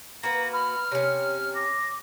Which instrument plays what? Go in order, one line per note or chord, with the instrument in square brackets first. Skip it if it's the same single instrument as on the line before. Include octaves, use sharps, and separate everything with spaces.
[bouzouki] A#3 F#4 B4 [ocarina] A#5 [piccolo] A#6
[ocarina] B5 [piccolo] F6
[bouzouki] C3 C#4 [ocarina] C#5
[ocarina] D6 [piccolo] A#6